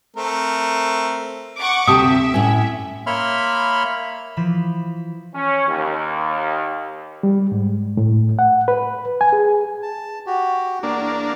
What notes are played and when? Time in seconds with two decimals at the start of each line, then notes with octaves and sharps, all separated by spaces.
0.17 A3 C4 A#4
1.58 F#5 C#6 D6
1.87 D2 C3 E5 A5 D6 D#6
2.34 A2 C#4
3.06 A#3 C#5 E5 B5 C6 F6
4.37 E3 F3 B5 E7
5.35 C#4
5.69 D#2
7.23 G3
7.52 G#2
7.97 A2
8.39 F#5
8.68 B4
9.21 G#5
9.33 G#4
9.82 A5
10.26 F#4 G4
10.83 E2 A#3 D4